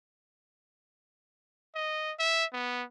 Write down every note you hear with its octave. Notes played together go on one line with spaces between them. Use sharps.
D#5
E5
B3